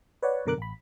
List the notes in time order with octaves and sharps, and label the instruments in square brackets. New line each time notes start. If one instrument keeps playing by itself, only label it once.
[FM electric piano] B4 C#5 D5 F#5
F#2 B2 D3 A#4 D6 F#6
A1 B5